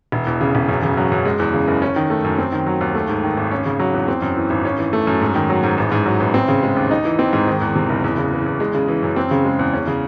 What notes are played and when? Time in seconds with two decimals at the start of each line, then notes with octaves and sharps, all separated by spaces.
0.12 E1
0.27 E2
0.41 C#3
0.55 E1
0.69 F#2
0.83 C#3
0.97 F#3
1.12 F#2
1.25 G#3
1.39 E2
1.53 C#3
1.68 F#1
1.82 C#4
1.96 D#3
2.10 A3
2.24 F#2
2.38 C4
2.52 D#3
2.67 F#3
2.81 D#2
2.94 A3
3.09 G#2
3.23 D#3
3.37 G#1
3.51 C#4
3.65 C#3
3.79 F#3
3.94 E2
4.08 C4
4.22 F#2
4.36 E3
4.50 G#1
4.65 C#4
4.79 E3
4.93 A3
5.07 F#2
5.21 G#2
5.35 D#3
5.50 F#3
5.63 G#2
5.78 A1
5.92 G#2
6.06 F#3
6.20 A1
6.34 C4
6.48 C#3
6.63 G#3
6.77 D#2
6.91 D#4
7.05 E3
7.19 C4
7.33 G#2
7.47 D#3
7.62 E2
7.75 C3
7.89 F#1
8.04 E2
8.18 C#3
8.32 E3
8.46 E2
8.60 G#3
8.74 C#3
8.88 E3
9.03 F#2
9.16 C4
9.31 C#3
9.45 G#3
9.59 E2
9.74 C#4
9.87 C#3